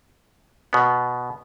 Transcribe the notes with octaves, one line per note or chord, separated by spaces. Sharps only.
B2 B3